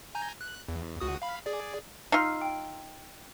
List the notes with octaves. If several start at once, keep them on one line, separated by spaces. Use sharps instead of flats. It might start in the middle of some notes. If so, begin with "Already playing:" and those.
G#5 A#5 G6
F#6
E2
C#2 F#4 D#6
F5 B5
G#4 D5
D#4 F4 E6 F6 C7
G5